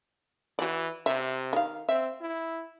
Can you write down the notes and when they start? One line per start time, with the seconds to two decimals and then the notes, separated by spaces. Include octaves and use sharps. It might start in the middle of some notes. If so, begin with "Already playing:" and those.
0.59 E3 F#4 G4 D5
1.06 C3 E5
1.53 D#3 F5
1.89 C4 E5
2.21 E4